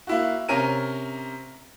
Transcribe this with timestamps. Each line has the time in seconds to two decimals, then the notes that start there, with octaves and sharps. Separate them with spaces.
0.07 A#3 E4 F#4
0.48 C3 C#4 A#4 D#7